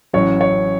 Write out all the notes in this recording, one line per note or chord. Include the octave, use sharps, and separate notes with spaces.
A1 A2 F#3 C#4 C#5
C#5